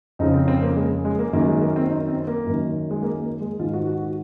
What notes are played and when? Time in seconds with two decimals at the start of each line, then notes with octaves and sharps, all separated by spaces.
0.19 F2 C#3 D#4
0.34 C4
0.48 C4
0.62 A#3
0.76 G#3
1.05 G#3
1.19 A#3
1.33 F#2 D#3 A#3
1.47 G#3
1.61 A#3
1.76 C4
1.90 D#4
2.08 C4
2.27 A#3
2.46 F#2 D#3
2.91 G#3
3.03 A#3
3.21 A#3
3.41 G#3
3.59 G#2 D#3 F4
3.74 F#4
3.87 F#4
4.02 F#4